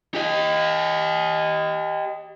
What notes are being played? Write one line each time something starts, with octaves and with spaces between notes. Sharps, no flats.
G4 D#5